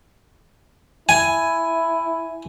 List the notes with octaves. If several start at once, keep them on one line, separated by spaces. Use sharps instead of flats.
E4 G#5